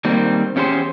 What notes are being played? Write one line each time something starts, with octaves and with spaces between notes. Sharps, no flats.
D#3 G3 A#3 C4
E2 C#4 G4 G#4 C5